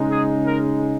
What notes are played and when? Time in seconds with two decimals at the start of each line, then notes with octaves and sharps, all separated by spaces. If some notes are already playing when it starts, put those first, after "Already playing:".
Already playing: C#3 G#3 D#4
0.11 G#4
0.46 A#4